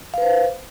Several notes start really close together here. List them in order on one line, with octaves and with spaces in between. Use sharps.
F5 B4 C5